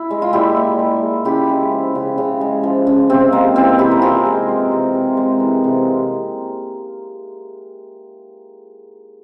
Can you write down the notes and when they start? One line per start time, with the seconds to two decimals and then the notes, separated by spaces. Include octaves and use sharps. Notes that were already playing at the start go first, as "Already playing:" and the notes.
Already playing: E4
0.10 G#3
0.22 F4
0.33 A#2 E4 G4
0.56 A#2
0.79 G#3
1.02 G#3
1.25 C#3 E4 G4
1.49 G#3
1.71 F3
1.95 C#3
2.18 C#3
2.41 G#3
2.63 F3
2.87 C#3
3.10 C3 C4
3.33 G#3 A#3
3.56 E3 C4
3.78 C3 E4 G4
3.91 A#4
4.02 C3 F4 G#4
4.26 G#3
4.48 E3
4.71 C3
4.95 C3
5.17 G#3
5.40 E3
5.64 C3